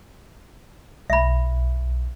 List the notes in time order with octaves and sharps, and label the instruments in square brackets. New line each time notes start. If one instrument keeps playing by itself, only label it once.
[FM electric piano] B1 [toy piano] E5 B5